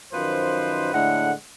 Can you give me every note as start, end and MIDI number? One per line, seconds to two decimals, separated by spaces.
0.13 0.92 42
0.13 0.92 51
0.13 0.92 53
0.13 0.92 71
0.13 0.92 72
0.93 1.32 45
0.93 1.32 50
0.93 1.32 56
0.93 1.32 78